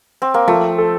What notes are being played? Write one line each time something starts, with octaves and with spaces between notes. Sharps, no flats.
C4
A#3
F3 A3
A4